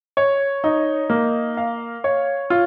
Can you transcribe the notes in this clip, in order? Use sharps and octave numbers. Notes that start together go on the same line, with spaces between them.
C#5
D#4
A#3
F5
C#5
F4